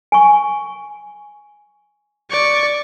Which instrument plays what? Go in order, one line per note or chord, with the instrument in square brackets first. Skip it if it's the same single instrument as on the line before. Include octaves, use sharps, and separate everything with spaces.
[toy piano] G#5 C#6
[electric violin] D5 C#6